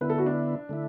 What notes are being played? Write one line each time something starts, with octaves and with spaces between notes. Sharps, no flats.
D3 B3 E4 B4
A4
F#4
D4
D3 A3 E4